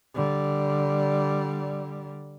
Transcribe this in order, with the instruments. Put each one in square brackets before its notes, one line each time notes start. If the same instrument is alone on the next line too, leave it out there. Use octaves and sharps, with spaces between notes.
[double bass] D3 G3